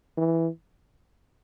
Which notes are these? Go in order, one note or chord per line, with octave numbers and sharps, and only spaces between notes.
E3